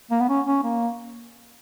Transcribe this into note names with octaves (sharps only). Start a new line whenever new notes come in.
A#3
B3
C#4
C#4
A#3